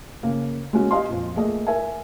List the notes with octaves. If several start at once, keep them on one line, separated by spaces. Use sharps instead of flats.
C#3 A#3
G#3 A#3 C#4 F#4
G4 D#5 F5 G#5 C6
F2 A#2
A3 A#3 G#4 D#5
A#4 E5 G#5